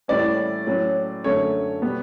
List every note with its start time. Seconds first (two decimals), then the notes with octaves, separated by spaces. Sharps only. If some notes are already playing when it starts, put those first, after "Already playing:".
0.08 A2 E3 G3 C#4 D5
0.67 A2 F#3 C#4
1.24 F#2 D3 A3 C#4 C#5
1.82 B2 G3 B3